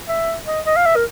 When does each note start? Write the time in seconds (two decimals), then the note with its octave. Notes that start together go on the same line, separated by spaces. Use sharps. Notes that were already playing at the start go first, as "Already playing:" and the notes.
0.08 E5
0.46 D#5
0.66 D#5
0.76 F5
0.85 E5
0.96 A#4